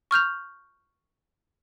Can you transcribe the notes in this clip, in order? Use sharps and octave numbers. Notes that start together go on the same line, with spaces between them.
C#6 F6 G6 F7